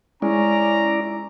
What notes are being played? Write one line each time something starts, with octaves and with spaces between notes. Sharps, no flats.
G#3 C#4 E4 D5 A#5